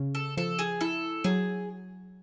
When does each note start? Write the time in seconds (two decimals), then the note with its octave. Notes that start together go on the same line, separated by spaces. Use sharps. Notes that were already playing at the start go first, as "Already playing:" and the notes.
Already playing: C#3
0.15 A4
0.37 F3 A4
0.59 G#4
0.81 E4 A4
1.24 F#3 G#4